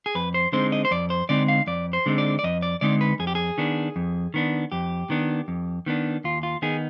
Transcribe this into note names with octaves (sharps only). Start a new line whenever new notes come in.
G#4
F2 B4
C5
D3 G#3 C4 D#4 C5
D#5
C5
F2 D5
C5
D3 G#3 C4 D#4 D5
F5
F2 D5
C5
D3 G#3 C4 D#4
D5
D5
F2 D#5
D5
D3 G#3 C4 D#4 D5
B4
F2 G#4
G4
G#4
D#3 B3 D4
F2
D#3 B3 D4
F2 G4
D#3 B3 D4
F2
D#3 B3 D4
D#2 F4
F4
D#3 B3 D#4 G#4